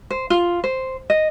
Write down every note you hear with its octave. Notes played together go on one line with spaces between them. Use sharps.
C5
F4
C5
D#5